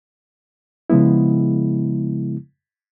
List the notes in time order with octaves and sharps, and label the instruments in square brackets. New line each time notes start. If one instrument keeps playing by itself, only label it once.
[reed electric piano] C#3 F3 G#3 B3 E4